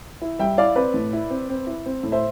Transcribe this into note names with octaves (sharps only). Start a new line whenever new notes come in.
E4
G3 E5 G5
E4 D5 F5
C4 B4 D5
A2
E4
C4
C4
E4
C4
A2
C5 E5